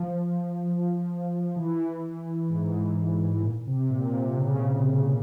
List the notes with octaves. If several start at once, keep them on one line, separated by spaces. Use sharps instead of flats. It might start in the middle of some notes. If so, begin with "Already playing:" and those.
Already playing: F3
E3
G#2
A#2
C3
A#2
C3
C#3